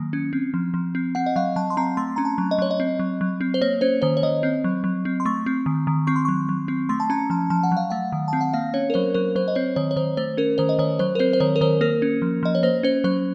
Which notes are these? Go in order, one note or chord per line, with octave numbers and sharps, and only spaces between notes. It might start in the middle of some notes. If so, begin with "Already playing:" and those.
Already playing: D#3 F#3 A#3
C#4
C4
F3
F3
C4
C4 F#5
D#5
F#3 F5
F#3 A5
C6
C4 A#5
A3 C6
C#4 A#5
A5
F#3
D#5
F#3 C#5
D#5
C4
F#3
F#3
C4
C5
A#3 C#5
C#4 C5
D#3 C5
C#5
D#3 D#5
C4
F#3
F#3
C4
C6
A3 C#6
C4
D#3
D#3
C4 C#6
C6
F#3 C#6
F#3
C4
A3 C6
A5
C#4 A#5
F3 A5
F3 A5
F#5
F#3
F5
A3 F#5
D#3
C4 A5
F#5
A#3 F5
C#4 C#5
A#4
F#3 C5
F#3 A#4
F#3 C5
D#5
C4 C#5
D#3 C#5
C#5
D#3 C5
A3 C5
C#4 A#4
D#3 C5
D#5
D#3 C#5
F#3 C5
A#4
C4 C5
C5
D#3 C#5
A#4
D#3 C5
A#3 A#4
C#4
F3
F3 D#5
C#5
A#3 C5
C#4 C5
F#3 C5